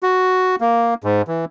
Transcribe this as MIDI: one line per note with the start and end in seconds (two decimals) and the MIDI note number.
0.03 0.56 66
0.60 0.94 58
1.04 1.22 44
1.27 1.45 52